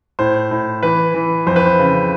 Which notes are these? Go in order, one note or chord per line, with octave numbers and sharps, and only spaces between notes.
A2 C5
A2
E3 B4
E3
F2 C5
B4
C5
C#3